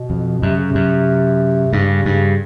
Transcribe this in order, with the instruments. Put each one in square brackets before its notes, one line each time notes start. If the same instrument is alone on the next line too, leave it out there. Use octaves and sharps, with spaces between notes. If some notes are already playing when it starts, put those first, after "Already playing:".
Already playing: [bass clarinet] B2
[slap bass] F2
[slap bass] F#2 [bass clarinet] C3
[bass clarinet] C#3
C3
[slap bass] F#2
[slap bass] G2 [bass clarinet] C#3
[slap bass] G2